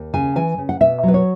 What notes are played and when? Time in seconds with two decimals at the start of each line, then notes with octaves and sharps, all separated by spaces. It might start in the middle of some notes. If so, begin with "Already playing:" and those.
Already playing: D#2
0.14 C#3 G#5
0.36 E3 G#5
0.58 C#3
0.69 F#5
0.80 B2 E5
1.03 F#3 B4
1.14 C#5